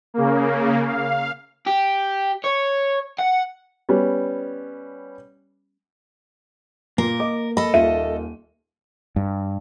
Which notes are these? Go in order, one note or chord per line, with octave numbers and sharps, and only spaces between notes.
C#3 A#3
F5
G4
C#5
F#5
G3 B3 C#4
A#2 A#3 A#4
D#5 D6
A4 D#5 B5
D#1 F4 E5 D#7
G2